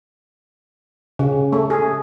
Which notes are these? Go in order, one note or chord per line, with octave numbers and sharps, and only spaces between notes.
C#3
A3
G#4